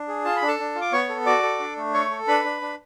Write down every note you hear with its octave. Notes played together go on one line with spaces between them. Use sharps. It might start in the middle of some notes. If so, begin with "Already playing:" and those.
Already playing: D4
G#4
F4 A5
B5
D4
A4 A5
D4
F4
D6
B3 C#5 C#6
A4
F#4 D5 D6
A4
D4
A3
A4 C#5 C#6
A4
D4 B4 B5
D4
D4